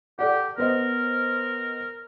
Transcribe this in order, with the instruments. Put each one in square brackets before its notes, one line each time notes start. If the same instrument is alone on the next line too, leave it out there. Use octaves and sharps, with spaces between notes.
[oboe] G4 [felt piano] A4 D5 F#5
[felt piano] B3 C5 D#5 [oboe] A#4